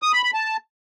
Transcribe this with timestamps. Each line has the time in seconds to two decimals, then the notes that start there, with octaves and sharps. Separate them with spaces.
0.02 D#6
0.13 B5
0.23 B5
0.34 A5